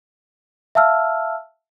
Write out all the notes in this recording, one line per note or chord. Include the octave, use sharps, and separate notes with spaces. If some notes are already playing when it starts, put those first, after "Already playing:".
E5 F5 A5 E6 F6